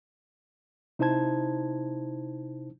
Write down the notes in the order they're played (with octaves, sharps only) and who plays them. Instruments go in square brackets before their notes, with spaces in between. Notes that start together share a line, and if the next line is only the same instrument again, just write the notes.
[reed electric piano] C3 D#4 E4 C5 A5 G#6